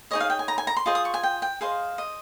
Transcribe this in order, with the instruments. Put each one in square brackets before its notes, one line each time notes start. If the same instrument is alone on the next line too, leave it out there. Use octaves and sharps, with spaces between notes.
[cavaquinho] D#4 G#4 C#5 D#5
F5
G5
G#5
A#5
G#5
A#5
C6
F4 G#4 C5 D#5
D#6
C#6
G#5
G5
G5
G#4 C5 D#5 F5
D#5